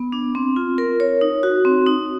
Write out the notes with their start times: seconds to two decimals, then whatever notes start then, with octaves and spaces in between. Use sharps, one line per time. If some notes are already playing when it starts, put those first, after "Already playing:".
Already playing: B3
0.12 D4
0.35 C4
0.56 F4
0.78 A#4
1.00 C#5
1.21 D#4
1.43 F#4
1.65 C4
1.87 D#4